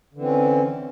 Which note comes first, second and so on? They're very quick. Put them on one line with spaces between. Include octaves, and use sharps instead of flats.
D3 E3 C4 C#4